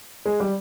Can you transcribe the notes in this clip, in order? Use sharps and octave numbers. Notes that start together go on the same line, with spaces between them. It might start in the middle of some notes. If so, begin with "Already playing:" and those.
G#3
G3